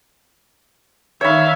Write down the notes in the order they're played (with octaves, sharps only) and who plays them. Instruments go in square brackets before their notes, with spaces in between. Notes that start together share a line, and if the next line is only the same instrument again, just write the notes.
[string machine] D#3 [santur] C#5 B5 [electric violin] E5 F5